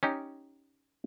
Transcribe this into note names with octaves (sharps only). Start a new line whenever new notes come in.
C#4 D#4 G4